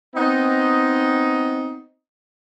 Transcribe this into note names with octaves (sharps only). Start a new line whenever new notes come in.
B3 C4 D#4